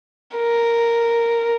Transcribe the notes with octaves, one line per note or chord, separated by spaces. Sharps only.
A#4